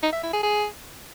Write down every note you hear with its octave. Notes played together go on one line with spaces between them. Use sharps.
D#4
E5
E4
G#4
G#4